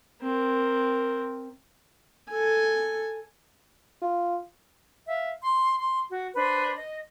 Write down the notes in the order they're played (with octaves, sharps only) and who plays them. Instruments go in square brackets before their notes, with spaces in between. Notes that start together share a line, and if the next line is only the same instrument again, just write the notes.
[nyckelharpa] C4 A#4
[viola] A4 G#5
[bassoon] F4
[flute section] E5 F5
C6
C6
F#4
D4 B4 C5
D#5